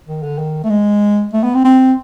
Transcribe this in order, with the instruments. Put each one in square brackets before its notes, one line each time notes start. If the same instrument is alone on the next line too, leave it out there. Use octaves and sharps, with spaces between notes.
[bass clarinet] D#3
D3
D#3
A3
G#3
A3
B3
C4
C4